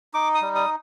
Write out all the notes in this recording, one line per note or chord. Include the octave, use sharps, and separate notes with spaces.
D#4 D6
D#6
G3
D#6